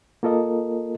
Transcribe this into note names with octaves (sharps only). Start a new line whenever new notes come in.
A#3 F4 A4 A#4 D#5